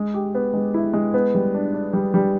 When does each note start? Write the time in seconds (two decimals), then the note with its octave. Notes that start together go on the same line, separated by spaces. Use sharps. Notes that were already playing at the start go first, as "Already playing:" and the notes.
Already playing: G#3
0.14 G4
0.35 B3
0.54 G#3
0.74 E4
0.93 G#3
1.14 B3
1.34 G3
1.54 D4
1.74 D4
1.93 G3
2.14 G3